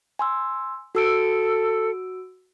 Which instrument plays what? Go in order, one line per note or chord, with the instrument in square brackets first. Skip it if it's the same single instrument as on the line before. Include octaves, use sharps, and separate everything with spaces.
[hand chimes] G#5 C6 E6
[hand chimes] F#4 E6 D7 [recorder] A4